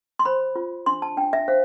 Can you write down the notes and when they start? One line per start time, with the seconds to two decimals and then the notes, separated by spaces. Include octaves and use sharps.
0.19 C6
0.25 C5 B5
0.56 F4
0.86 D4 C6
1.02 A5
1.17 D4 G5
1.33 E5
1.48 C5 F5